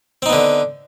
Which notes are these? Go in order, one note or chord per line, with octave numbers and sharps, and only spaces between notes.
D3 B3 C4 D#4